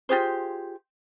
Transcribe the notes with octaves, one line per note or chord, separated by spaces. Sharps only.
F4 G4 G#4 C5